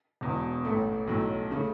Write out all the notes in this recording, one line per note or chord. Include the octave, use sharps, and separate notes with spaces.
E1 E2 B2
A1 A2 A3
B1 A2 F#3
C#3 A3